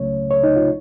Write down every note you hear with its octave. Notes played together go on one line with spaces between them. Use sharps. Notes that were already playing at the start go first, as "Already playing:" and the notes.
Already playing: C#2 C#3 F#3 A3 C#4 C#5
C#5
D#4
F4